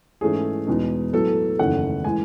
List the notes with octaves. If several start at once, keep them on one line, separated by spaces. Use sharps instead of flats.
G#2 E3 A3 C#4 E4 G#4
E2 B2 G#3 D#4
A2 F#3 B3 A4
F#1 E2 D#3 A3 C#4 F#5
A2 E3 G#3 G#5